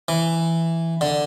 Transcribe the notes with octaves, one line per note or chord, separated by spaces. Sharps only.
E3
D3